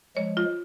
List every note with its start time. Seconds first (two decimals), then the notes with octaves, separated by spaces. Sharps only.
0.16 F3 G#3 C#5
0.37 F4